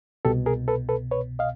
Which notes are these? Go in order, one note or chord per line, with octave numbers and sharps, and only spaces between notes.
C2 B2 G4 A4
G#4 A#4
A4 B4
A4 B4
B4 C#5
D#5 F5